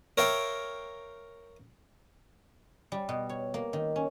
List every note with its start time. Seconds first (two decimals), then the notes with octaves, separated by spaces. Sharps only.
0.18 A#4 C#5 E5 F5 G5
2.92 G3
3.09 B2
3.29 C#5
3.54 A#3
3.73 D#3
3.96 C#4